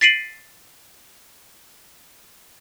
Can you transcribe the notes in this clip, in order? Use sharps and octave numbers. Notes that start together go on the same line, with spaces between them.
A6 B6 C7 D7 D#7 F#7